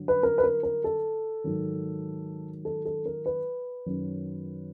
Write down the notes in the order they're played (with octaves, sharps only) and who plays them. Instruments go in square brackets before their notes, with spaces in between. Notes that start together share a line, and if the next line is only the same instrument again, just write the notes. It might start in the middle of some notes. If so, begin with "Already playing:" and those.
Already playing: [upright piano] G2 D3 F#3
B4
A#4
B4
A#4
A#4
A4
G#2 D#3 F#3
A4
A4
A#4
B4
F#2 D#3 F#3